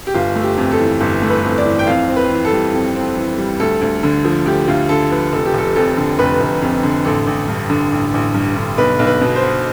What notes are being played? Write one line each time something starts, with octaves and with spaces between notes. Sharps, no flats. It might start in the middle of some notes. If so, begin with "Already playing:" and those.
G4
G1 F4
A3
G4
F2
A4
E3
G1 A4
A3
B4
F2
D5
E3
G5
F2 F5
C4
B4
E3
A4
G3
F2
C4
E3
G3
D2 A4
D2
D3
F3
D2 G4
D2 F4
D3 A4
F3 B4
F1 A4
G4
F1 A4
F2 A4
D3
F1 B4
F1
F2
D3
A1 A4
A1
G2
D3
A1
A1
G2
D3
B1 B4
B1
B4
B2
C5
B3